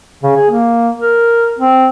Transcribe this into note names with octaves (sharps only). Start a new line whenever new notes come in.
C#3
G#4
A#3
A#4
C4